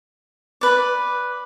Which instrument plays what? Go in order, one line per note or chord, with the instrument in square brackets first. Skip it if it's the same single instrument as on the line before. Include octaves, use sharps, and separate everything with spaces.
[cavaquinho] B4 D5